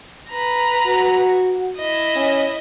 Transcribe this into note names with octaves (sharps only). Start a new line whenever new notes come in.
B4 A#5
F#4
E4 D#5
C#4